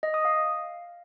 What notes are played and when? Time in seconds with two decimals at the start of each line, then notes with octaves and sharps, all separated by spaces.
0.03 D#5
0.14 D#6
0.25 F5